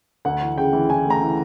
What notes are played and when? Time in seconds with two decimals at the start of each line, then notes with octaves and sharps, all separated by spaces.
0.25 D2 F#5
0.41 E3
0.57 C#3 G5
0.73 E3
0.89 E3 G#5
1.06 A3 A#5
1.22 E3